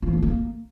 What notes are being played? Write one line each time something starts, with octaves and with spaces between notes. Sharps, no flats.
F4
F3
A#3
D#3
A#3